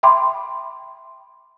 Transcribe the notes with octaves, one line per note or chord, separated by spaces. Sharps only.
E5 G5 B5 C6 D6